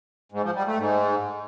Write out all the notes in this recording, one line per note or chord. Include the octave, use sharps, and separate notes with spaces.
G#2
F3
G3
A3
G#2